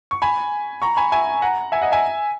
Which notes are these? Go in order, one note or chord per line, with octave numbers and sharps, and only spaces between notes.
C#6
G#5 B5
A#5 C#6
G#5 B5
E5 G#5
F#5 A#5
E5 G#5
D#5 F#5
E5 G#5